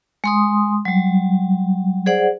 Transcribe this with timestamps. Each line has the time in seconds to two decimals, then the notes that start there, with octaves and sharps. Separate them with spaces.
0.24 G#3 C6 D#6
0.85 F#3 G3
2.06 G#4 C5 D5 F#5